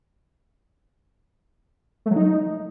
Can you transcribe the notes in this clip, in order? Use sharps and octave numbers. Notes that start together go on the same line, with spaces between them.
A3
F#3
D#4